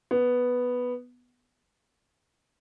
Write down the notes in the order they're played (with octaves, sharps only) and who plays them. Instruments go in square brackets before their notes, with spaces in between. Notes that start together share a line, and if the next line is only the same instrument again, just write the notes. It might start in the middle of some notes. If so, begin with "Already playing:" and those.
[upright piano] B3